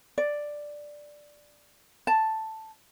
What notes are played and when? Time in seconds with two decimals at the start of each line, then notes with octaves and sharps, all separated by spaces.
0.18 D5
2.07 A5